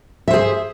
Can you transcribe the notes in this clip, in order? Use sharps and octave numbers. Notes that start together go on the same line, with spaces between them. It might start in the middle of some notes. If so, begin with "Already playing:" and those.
G#4 C5 E5